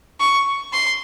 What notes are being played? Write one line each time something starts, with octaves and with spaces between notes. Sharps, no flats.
C#6
C6